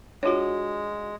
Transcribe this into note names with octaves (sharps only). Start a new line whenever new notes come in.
G#3 D4 F4 F#4 C#5